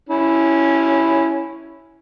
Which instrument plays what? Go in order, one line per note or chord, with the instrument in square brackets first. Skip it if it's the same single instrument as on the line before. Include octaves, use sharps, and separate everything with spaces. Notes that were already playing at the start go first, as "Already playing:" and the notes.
[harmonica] C#4 E4